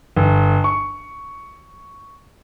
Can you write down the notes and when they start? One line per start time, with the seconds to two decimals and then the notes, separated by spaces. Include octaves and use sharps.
0.16 G1
0.64 C#6